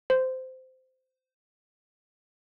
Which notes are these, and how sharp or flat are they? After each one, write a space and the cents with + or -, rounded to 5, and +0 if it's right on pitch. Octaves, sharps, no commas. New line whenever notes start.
C5 -15